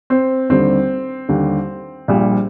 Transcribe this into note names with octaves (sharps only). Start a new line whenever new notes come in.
C4
D#2 D3 G3 C4
D#2 D3 G3
A#1 A#2 G3